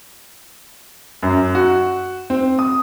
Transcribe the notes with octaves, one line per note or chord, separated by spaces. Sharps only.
F#2
F#4
C4
D#6